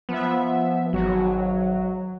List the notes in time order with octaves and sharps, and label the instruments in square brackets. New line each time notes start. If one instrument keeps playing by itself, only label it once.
[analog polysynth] F3 E5 [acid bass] B3
[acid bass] G#1 [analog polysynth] F#3